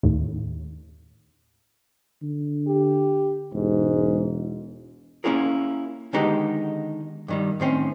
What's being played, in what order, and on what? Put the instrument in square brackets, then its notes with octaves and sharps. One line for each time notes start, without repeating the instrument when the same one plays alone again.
[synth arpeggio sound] D#2 A2
[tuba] D3
[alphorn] G4
[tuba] E1 [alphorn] G#2
[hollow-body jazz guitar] A#3 C#4 E4 F4 G#4 A#4
D3 D#3 G#3 B3 D#4 G4
G2 D#3 G3
A2 D#3 C4 C#4